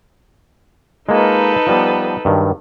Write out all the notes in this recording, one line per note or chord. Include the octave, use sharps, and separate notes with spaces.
G#3 A#3 D#4 F4 A4 B4
F3 G3 B3
G2 D#3 F#3